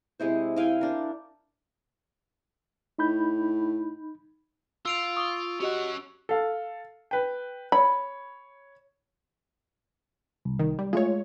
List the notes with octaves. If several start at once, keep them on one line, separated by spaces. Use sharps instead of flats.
C3 G#3 E4 C5
E4 F5 G5 G#5
D4 A#4
A2 D#4 B5 G6
F4 E6 D7 F7
C#6 D#6 G7
C#4 F#4 G4 D#5 F#5
A4 F5
B4 G5
C#5 B5
C2
D#3
G3
G#3 A3 F4 C#5